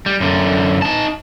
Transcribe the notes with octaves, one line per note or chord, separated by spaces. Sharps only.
G3
F#2 D3
D#4 A5